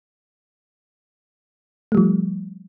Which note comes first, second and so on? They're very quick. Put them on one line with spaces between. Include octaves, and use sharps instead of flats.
A3 G3 F3